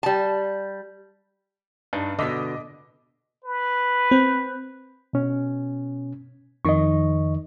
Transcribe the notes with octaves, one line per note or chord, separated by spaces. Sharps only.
G3 A5
G2 D4 D#4
B2 D3 D#5 D6 B6
B4
C4
B2 C#4
F2 D#3 D#5 C#6